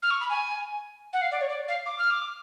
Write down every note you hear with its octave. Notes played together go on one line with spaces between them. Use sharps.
F6
C#6
B5
G#5
F#5
F5
D5
C#5
D5
F5
D6
F6
D6